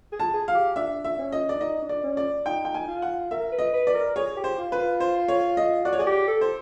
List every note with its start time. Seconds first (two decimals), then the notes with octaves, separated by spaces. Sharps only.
0.12 G#4
0.20 A5
0.34 G#4
0.48 F5
0.55 G4
0.76 D4 E5
1.04 E5
1.19 C#4
1.32 D#5
1.49 D4 D5
1.60 D#4 D#5
1.82 D4
1.89 D5
2.04 C#4
2.17 D5
2.46 D#4 G5
2.65 G5
2.74 G#5
2.88 F4
3.02 F#5
3.31 A#4 E5
3.52 B4
3.59 D#5
3.73 B4
3.87 D5
3.94 A#4
4.16 G#4 C#5
4.36 G4
4.44 C5
4.58 F4
4.72 B4
4.79 F4
5.00 C5
5.28 C#5
5.57 D#5
5.85 F#4 D5
5.93 C#5
5.99 G#4 D5
6.06 G4
6.28 A4
6.41 C5